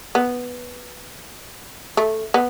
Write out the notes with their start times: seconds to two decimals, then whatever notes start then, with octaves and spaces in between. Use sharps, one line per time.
0.15 B3
1.97 A3
2.34 B3